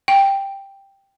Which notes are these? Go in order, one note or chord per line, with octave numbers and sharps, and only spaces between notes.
G5